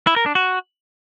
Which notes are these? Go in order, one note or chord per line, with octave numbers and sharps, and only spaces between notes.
E4
A#4
D4
F#4